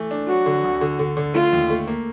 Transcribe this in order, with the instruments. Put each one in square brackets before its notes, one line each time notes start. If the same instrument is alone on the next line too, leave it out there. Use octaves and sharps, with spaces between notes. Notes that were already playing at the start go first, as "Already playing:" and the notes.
Already playing: [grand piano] E3 A3
D4
[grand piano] F#3 [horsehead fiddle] F#4
[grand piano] D3
D2
D3
D3
D3
[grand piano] A3 [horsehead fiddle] F4
[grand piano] D#2
A3
A#3